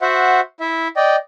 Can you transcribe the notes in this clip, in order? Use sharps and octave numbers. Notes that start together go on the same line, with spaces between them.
F#4 C5 E5 F#5
E4 E5
D5 D#5 G5